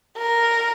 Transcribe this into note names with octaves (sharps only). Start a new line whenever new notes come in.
A#4